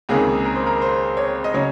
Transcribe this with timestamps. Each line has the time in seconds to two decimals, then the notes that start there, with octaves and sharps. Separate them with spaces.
0.09 C#2 C3 D#3 A#3 C#4 G#4
0.45 A#4
0.55 C5
0.66 A#4
0.82 C5
1.17 C#5
1.44 D#5
1.54 C#3 F#3 C#5